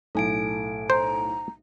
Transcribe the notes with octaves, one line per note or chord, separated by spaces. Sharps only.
B1 A2 A4 G#5 D7
C5 A#5